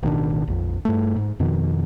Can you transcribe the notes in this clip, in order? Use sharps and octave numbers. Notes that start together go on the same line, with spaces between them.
A1 B2 D#3 D4
A#1 F2
G2 A3
G#2
F2 B2 D#3